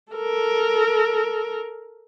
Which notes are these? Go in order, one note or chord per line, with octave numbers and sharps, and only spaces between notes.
A4 A#4